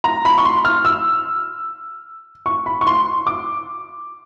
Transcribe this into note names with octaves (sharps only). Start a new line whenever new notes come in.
A#5
B5
C#6
C6
F6
E6
C#6
B5
C#6
C6
D6